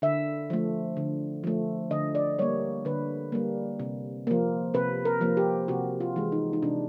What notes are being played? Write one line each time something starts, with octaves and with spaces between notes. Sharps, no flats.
D3 E5
F3 A3
D3
F3 A3
D3 D#5
D5
G3 A#3 C#5
D3 B4
G3 A#3
C3
F3 A#3
C3 B4
A#4
F3 A#3
G4
C3 F#4
F4
E3 G#3
D#4
D#4
C3 D4